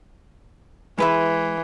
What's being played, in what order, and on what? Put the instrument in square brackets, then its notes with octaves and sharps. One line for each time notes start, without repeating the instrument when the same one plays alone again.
[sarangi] E3 [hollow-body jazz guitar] G#3 B4 E5